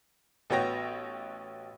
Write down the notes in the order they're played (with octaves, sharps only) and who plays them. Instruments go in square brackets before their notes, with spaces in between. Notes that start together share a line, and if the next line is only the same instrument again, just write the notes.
[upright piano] A1 B3 F#4 C#5 G5 A#6